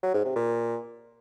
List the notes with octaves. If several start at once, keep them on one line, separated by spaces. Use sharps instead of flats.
F#3
G#2
C3
A#2